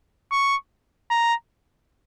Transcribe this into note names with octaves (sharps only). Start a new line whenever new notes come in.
C#6
A#5